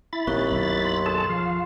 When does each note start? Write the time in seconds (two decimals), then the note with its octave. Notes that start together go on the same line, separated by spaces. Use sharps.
0.13 E4 B5 A6
0.27 A#1 D#2 C4 C#6 F#6
0.50 B1 F#2
0.85 C6
1.06 G#4 A4 A5 C6
1.29 F3 F5